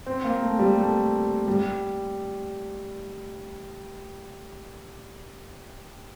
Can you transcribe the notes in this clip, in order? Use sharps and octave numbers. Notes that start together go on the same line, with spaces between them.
C4
A#3
A3
G3
A3
G3